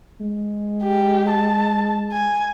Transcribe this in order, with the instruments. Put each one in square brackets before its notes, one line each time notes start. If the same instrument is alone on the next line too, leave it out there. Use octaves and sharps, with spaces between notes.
[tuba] G#3
[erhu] G4
A5
G#5